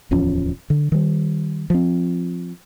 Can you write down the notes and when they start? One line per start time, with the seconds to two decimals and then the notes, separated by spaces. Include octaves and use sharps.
0.11 D1 E2 F3 C#4
0.70 D3
0.92 D#3 G3
1.70 F3 C4